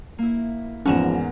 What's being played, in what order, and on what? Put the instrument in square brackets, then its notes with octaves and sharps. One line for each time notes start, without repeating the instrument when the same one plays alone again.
[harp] A#3 E4
[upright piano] E2 G#2 [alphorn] F3 [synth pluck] C#4 G#5 E7 [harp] A#4 F#5